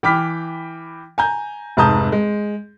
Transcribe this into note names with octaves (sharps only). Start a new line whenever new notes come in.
E3 G5 B5 D6 F6 B6
G#5 A#5 G6
F1 G#2 A5 A#5 D#6 G6
G#3